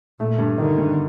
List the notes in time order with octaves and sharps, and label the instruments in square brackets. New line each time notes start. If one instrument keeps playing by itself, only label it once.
[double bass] A#2 [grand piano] A3
[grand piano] G2
[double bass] D3 [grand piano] D#3
[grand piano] G2